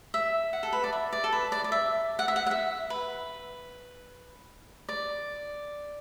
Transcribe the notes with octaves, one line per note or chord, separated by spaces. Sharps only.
E5
F#5
A4
B4
D5
E5
D5
A4
B4
D5
D5
E5
F#5
E5
F#5
F#5
E5
B4
D5